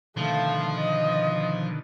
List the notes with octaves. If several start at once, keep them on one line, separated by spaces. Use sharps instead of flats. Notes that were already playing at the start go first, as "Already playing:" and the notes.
B2 D3 D#3 F3 A3 F5
D#5